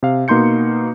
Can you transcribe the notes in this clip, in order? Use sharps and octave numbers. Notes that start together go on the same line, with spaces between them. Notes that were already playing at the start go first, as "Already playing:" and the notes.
C3 F5
B2 A#3 D#4 C6 G6 C#7